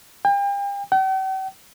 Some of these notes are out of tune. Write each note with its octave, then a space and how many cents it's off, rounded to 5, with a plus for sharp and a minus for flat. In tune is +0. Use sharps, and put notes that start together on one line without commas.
G5 +40
G5 -45